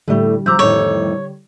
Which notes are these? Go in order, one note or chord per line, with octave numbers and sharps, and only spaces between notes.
A2 D3 G3 A3
F3 A#5 D6 E6 G6
F2 A2 D#3 C#5